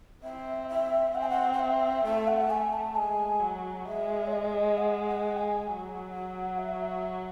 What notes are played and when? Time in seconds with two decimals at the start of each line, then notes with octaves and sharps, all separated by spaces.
0.23 C4 E5
0.69 E5
1.15 C4 F#5
1.21 G#5
1.29 F#5
1.53 F#5
1.59 E5
2.05 A3 E5
2.28 F#5
2.50 A3 G#5
2.73 A5
2.95 G#3 G#5
3.40 F#3
3.86 G#3 E5
4.26 C#5
4.31 D#5
4.77 F#5
5.07 F#5
5.37 G#5
5.68 F#3
6.13 F#5
6.58 E5